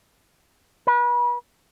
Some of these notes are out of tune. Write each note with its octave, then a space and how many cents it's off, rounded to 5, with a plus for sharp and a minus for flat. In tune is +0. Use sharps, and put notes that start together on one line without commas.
B4 -35